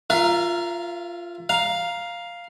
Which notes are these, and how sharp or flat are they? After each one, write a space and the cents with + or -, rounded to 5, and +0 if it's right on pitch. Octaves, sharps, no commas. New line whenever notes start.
F4 -5 A#4 +0 E5 +35
F5 +0 A#5 +10